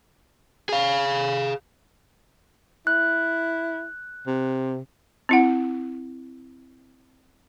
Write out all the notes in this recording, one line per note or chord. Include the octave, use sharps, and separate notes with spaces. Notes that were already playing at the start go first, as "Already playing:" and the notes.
G#4 F5
E4 F#6
C3
C4 E4 F#5